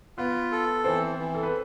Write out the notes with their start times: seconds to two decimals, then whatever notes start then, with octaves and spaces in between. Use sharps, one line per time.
0.18 B3 F4 B4
0.52 A4
0.84 E3 C4 C5
1.19 E3
1.35 A4
1.43 B4